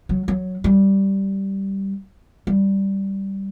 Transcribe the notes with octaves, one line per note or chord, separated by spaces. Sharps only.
F#3
F#3
G3
G3